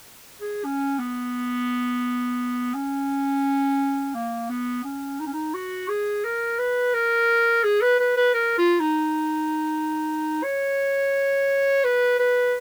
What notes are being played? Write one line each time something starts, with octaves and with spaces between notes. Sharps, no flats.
G#4
C#4
B3
C#4
A#3
B3
C#4
D#4
C#4
D#4
F#4
G#4
A#4
B4
A#4
G#4
B4
B4
B4
A#4
F4
D#4
C#5
B4
B4